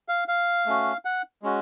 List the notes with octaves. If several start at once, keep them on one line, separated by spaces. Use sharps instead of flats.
F5
F5
A3 C#4 F#4
F#5
G#3 C#4 F#4